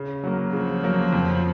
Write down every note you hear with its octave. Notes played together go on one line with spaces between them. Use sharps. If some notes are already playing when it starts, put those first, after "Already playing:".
Already playing: C#3
F#3 A#3
C#3 F3
F#3 A#3
F2